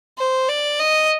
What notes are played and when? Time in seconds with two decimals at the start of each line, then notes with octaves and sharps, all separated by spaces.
0.18 C5
0.49 D5
0.80 D#5